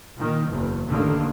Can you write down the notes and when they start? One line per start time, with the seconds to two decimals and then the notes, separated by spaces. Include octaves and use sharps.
0.18 A#2 D#3
0.50 F#1 E2
0.88 A1 D3 D#3 A#3